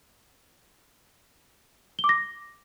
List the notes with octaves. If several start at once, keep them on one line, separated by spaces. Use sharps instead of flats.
G7
D6
A#6